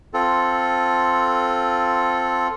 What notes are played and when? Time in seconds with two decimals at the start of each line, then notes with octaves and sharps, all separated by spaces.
0.14 C4 F4 A4